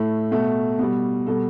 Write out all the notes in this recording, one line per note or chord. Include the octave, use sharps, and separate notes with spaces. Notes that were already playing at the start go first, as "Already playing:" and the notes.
Already playing: A2 A3
B2 A3
B2 G3
B2 G3 A4